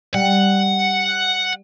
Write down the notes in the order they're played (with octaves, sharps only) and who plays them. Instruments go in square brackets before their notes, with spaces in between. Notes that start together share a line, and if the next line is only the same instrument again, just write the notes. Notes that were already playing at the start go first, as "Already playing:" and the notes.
[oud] G3 [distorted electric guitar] F#5